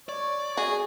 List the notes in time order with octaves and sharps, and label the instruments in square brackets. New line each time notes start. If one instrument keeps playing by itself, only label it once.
[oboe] C#5 [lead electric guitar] D5
[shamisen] F#4 [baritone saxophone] G#4